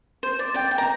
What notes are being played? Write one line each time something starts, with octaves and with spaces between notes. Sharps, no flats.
C5
D5
D5 G5
G5
A#5